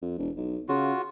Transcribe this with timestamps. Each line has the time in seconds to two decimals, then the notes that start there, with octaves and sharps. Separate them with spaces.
0.02 F2
0.18 E1
0.37 B1
0.69 C#3 F4 F#4